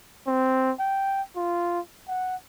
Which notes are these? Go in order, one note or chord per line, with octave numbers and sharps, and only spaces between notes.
C4
G5
F4
F#5